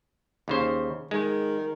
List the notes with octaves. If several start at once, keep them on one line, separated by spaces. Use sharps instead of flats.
D#2 C#3 C5
D#3 G#3